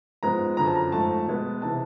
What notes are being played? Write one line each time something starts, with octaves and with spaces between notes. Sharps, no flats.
G#2 F3 G#3 B3 A#5
F#2 D3 F3 A#5
A5
A#5
G#2 F3 A3 A5
B2 G#3 B3
C3 E3 A5